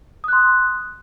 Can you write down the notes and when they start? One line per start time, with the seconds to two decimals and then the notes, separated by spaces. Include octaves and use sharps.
0.24 D#6
0.28 F#6
0.33 C6